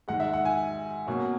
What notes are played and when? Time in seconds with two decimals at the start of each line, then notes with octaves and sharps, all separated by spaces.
0.08 G#2 D#3 G#3 F#5
0.20 E5
0.33 F#5
0.45 G#5
1.07 B2 F#3 A#3 C#4